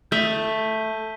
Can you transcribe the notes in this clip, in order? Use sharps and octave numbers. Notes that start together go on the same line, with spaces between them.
A3 G6 B6 D#7 G7